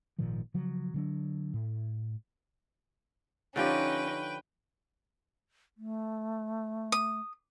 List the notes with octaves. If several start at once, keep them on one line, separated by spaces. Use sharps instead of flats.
G#1 A#2 D#3 F3
C#3 F3 F#3
D3 F#3 D4
A2
D3 F3 C#4 D#4 G4 B4 G5
A3
D#6